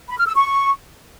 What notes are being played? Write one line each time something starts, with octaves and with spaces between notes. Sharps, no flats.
B5
F6
E6
C#6